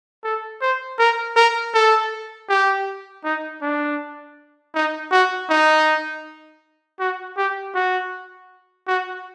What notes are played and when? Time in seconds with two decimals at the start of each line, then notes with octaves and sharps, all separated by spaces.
0.24 A4
0.61 C5
0.99 A#4
1.36 A#4
1.74 A4
2.49 G4
3.24 D#4
3.62 D4
4.75 D#4
5.12 F#4
5.50 D#4
7.00 F#4
7.37 G4
7.75 F#4
8.87 F#4